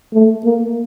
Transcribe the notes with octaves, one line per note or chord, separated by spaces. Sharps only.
A3
A#3